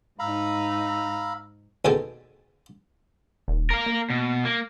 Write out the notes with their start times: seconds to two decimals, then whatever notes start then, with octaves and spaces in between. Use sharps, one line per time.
0.19 G#2 D#4 F5 A#5 B5 E6
1.85 D#2 B2 G#4 A4 G5
3.48 D#1
3.71 A#4 F5
3.86 A#3
4.10 B2
4.45 A#3